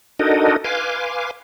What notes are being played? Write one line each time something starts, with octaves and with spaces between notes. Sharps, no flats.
D4 D#4 F#4 A4 A#4 D#5
B4 F5 G#5 C6 D6